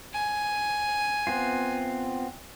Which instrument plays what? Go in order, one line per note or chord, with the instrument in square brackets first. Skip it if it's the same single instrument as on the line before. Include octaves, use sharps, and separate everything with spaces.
[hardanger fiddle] G#5
[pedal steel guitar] B3 C4 F4